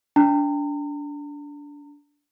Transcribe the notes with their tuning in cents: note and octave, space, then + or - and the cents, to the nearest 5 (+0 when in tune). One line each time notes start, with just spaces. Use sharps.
D4 -20 A#5 -40